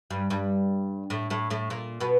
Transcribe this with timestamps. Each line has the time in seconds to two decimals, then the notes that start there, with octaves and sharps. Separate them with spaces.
0.10 G2 G3
0.30 G2 G3
1.10 A2 A3
1.30 A2 A3
1.50 A2 A3
1.70 A#2 A#3
2.00 B2 B3